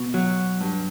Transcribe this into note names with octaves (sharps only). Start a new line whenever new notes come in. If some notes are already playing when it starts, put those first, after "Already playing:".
Already playing: B2
F#3
G2